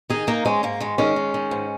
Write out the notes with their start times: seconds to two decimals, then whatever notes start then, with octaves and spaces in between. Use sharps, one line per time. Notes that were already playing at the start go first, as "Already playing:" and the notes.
0.10 D#3 D#4 G#4
0.27 D#3 A#3 D#4
0.45 G#2 G#3 C#4
0.63 G#2 A#3
0.80 D#3 G#3
0.98 D#3 G#3 C#4
1.16 D#3
1.34 D#3
1.51 G#2